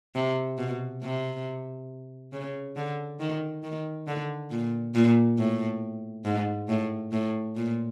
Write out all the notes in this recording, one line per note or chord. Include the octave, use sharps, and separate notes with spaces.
C3
B2
C3
C#3
D3
D#3
D#3
D3
A#2
A#2
A2
G#2
A2
A2
A#2